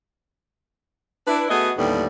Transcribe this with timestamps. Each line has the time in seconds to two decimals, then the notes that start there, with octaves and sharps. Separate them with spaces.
1.27 D4 E4 B4
1.49 A3 B3 F#4 G#4 D#5
1.76 D#2 A2 D3 G3 A3 B3